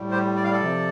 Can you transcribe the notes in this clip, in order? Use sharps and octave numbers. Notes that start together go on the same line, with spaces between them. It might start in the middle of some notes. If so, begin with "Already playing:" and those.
Already playing: A2 G3
G4 C5
D5
F5
A4 D5
C3 F3